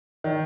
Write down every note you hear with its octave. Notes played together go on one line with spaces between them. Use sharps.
D#3